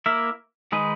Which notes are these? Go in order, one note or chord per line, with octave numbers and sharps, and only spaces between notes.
A#3 E4 A#4 E5
D#3 G#3 D#4 G#4 B4